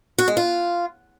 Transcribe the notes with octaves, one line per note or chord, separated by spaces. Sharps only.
F#4
G#3
F4